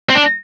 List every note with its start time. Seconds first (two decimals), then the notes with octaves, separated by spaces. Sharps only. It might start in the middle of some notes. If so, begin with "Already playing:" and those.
0.09 C4
0.15 D4